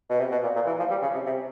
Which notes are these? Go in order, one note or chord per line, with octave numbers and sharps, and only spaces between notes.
B2
C3
B2
A#2
A#2
E3
F3
G3
C#3
C3
C3